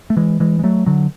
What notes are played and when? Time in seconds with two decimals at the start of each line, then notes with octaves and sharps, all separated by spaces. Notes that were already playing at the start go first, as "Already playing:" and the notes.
0.10 A3
0.17 E3 G#3
0.40 E3 G#3
0.59 G#3
0.64 F#3 A3
0.86 D3 F#3